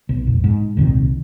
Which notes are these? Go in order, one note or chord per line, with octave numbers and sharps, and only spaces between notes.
B1
F1 B1
G#2
D#1 C2 C3 D#3